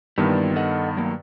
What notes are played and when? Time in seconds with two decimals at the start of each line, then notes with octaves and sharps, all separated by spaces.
0.18 G2 A#2 D#3 E3 G3 B3
0.56 A4 D#5 F#5
0.97 F#3 A#3